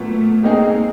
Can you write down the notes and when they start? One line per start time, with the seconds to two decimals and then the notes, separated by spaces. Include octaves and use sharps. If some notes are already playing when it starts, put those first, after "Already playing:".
Already playing: A#2 F#3 A3 B3
0.43 G#3 A#3 C4 D#4 G#4